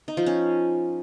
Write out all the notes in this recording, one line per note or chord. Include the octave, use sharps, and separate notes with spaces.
D#4
F3
C#4